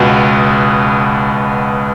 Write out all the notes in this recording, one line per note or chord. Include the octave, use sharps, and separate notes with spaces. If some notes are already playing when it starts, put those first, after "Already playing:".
Already playing: C#2 B2 B3